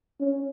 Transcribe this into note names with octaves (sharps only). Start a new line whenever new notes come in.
C#4